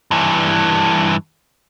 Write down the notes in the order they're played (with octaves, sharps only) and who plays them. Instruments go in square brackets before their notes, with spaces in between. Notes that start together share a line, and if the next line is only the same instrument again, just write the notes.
[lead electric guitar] G2 E3